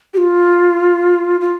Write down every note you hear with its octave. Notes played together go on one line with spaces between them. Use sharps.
G4
F4
F4